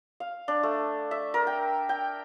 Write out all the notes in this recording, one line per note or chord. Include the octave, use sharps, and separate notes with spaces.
F5
D4
A3
E5
A#4
G5
G5